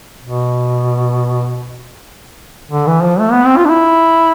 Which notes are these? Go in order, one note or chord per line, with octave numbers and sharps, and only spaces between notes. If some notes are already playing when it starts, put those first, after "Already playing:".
B2
D3
E3
F3
A3
B3
C4
F4
D4
E4